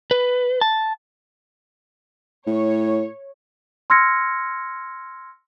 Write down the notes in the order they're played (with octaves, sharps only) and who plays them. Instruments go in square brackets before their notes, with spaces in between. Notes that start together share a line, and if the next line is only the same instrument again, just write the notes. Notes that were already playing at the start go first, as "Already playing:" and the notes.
[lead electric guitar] B4
A5
[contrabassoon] A2 [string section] C#5
[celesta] C6 E6 F6 G#6 A#6 C#7